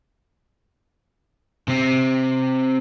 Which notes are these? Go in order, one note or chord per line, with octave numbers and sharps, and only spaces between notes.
C3 C4